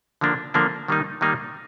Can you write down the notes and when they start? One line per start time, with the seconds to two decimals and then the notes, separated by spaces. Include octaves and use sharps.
0.21 D3 F3 A#3 D4
0.54 D3 F3 A#3 D4
0.88 D#3 G3 A#3 D#4
1.21 D#3 G3 A#3 D#4